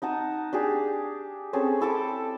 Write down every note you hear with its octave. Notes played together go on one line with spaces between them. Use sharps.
D#4 F#5 A5 D#6
D4 G4 G#4
C4 C#4 G#4 A4
E4 A4 A5 D6